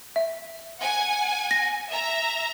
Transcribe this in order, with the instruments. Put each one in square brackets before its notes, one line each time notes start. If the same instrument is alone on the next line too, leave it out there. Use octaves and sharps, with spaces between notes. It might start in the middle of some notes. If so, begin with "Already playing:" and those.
[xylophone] E5
[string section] F#5 G#5
[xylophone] A#6
[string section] E5 A#5